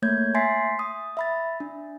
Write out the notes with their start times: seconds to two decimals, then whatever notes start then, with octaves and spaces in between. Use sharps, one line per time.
0.02 A3 A#3 C#5 G6 G#6
0.34 E5 G#5 C6 A6 B6 C7
0.79 D#6
1.17 E5 B5 A6
1.60 D4